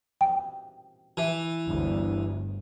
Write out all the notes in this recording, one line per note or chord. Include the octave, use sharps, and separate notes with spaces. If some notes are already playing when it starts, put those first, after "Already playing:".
G5
E3
G1 D2